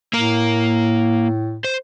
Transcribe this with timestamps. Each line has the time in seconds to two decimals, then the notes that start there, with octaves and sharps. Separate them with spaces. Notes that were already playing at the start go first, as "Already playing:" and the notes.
0.13 A2 A#3 A#4
1.64 C5